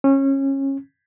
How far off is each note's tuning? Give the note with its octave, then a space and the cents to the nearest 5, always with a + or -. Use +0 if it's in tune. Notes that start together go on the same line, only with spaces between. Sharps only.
C#4 -25